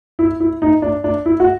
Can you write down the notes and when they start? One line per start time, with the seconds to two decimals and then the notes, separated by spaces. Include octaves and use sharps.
0.19 E4
0.40 E4
0.62 D#4
0.82 D4
1.04 D4
1.26 E4
1.40 F#4